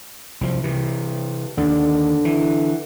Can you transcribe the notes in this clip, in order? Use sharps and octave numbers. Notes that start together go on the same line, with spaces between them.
C2 F3
C3 E3
D#2 D3
E3